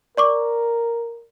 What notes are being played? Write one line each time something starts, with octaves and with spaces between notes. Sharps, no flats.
A#4 D5 C#6 D6